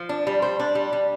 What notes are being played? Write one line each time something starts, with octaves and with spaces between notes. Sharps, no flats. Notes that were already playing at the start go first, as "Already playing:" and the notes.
Already playing: F3
D4
G3
C5
D4
G3
G3